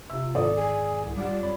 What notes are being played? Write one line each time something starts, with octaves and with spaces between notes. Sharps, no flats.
C3 F4 E5 E6
G#1 E2 G#2 A4 D5 D#6
G#4 G#5
C2
G3 F4 G4 D5 F#5
F2 C#5 B5